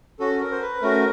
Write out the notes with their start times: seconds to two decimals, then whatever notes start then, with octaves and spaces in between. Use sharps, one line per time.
0.19 C#4 F#4 A4
0.41 A#4
0.52 C5
0.61 B4
0.82 A3 C#4 F#4 A#4